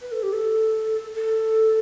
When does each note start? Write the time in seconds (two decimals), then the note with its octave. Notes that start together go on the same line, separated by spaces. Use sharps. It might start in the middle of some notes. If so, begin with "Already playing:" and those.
0.02 B4
0.12 A4
0.23 G4
0.33 A4
1.15 A4